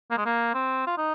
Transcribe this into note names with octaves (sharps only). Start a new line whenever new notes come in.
A#3
G#3
A#3
C4
F4
D#4